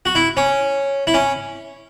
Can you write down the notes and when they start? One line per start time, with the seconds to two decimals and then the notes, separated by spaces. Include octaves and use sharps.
0.06 F#4
0.15 E4
0.37 C#4
1.07 E4
1.14 C#4